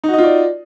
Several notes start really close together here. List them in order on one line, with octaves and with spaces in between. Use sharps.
D#4 F#4 D#5 F4 D5